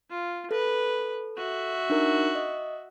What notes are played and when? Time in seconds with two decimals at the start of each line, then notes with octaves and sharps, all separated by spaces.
0.10 F4
0.51 A4 B4
1.37 F#4 E5
1.90 D4 D#4 A#4
2.35 D#5